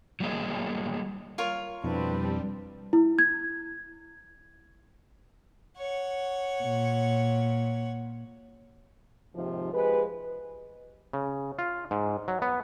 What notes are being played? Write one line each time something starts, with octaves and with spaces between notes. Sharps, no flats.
F#3 G3 A#3 G#4 D#5
F4 A#4 C#5
F2 B2 G3 C4 D4 E4 B4
E4
G#6
C#5 F#5
A#2
D#2 G#2 C3 F3
F3 G#3 G4 B4
C#3
F4
G#2
F#3
B3